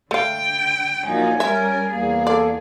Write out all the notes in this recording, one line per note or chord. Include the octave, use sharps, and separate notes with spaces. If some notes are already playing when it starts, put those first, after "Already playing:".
D3 A3 F5 G5
A#2 F3 F#3 A#3 D#4 G#5
G3 C#4 A#4 E5
E2 A#3 G#4
A4 D5